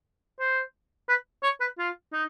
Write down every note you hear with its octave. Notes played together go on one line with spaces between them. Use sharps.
C5
B4
C#5
B4
F4
D#4